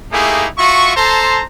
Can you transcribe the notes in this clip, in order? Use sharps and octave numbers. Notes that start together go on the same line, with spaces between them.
A3 A#3 D#4 E4 G4 G#4
F4 F#4 E5 C#6
A4 C5 A5 A#5 C6